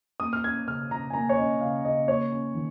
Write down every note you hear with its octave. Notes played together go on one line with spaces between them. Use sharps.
A#3 D#6
F6
C#4 G#6
C#3 F6
C#3 A#5
G#5
A#3 A#5
C#5
C#4 D#5
C#3 F5
C#3 D#5
A#3 C#5
C#4
D#3